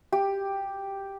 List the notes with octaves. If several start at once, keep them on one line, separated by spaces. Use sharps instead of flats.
G4